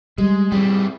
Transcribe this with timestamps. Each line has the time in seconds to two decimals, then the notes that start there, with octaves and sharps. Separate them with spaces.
0.18 G3 G#3
0.52 G3 C4 E4 G#4 B4